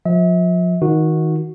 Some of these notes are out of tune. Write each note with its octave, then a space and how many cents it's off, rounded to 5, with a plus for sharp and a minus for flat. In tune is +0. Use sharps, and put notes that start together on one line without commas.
F3 +30 E5 -40
D#3 +25 D#4 +15 F#4 -15